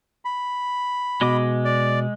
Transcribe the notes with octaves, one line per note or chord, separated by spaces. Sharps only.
B5
B2 G#3 D#5 D6
D5